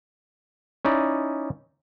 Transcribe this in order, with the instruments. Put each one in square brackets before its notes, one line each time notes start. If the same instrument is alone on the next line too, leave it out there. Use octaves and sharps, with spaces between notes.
[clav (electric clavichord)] C#4 D#4 E4 D5